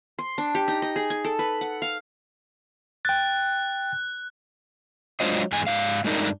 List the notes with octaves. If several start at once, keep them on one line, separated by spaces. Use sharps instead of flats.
C6
D4
G4
D#4
D#5
G#4
G#5
A4
B4
F#5
F5
G5 F#6 A6
F#3 G#3 D4 F4 C5 D#5
E2 G#2 G#3 G#5
G#2 F5
G2 G#3 A3 D4 D#4 A#4